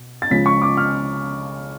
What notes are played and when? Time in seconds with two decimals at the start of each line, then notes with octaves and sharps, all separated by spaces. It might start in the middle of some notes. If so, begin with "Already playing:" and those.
Already playing: B2
0.22 A6
0.30 C#2 C#3 F3 G#3 B6
0.46 C#6
0.62 D6
0.77 F6